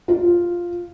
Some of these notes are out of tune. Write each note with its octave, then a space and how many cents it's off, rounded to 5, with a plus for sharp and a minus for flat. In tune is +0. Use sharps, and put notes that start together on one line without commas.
F4 +0